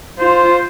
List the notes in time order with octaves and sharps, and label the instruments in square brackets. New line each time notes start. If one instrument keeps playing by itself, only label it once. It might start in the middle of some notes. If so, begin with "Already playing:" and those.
[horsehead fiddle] F4 [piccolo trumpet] C5